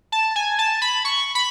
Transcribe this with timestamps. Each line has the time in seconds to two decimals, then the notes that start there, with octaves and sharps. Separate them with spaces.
0.12 A5
0.36 G#5
0.59 A5
0.82 B5
1.05 C#6
1.35 B5